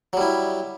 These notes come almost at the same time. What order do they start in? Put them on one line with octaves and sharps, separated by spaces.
F#3 G3 E4